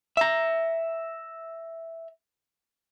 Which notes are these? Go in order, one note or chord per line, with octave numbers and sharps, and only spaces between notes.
E5 A#5